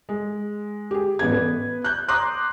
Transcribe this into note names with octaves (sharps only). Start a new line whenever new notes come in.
G#3
G4 G#4
A1 B3 G#6
B3 B4
F#6 G6
A#5 C6 D6 D#6 F#6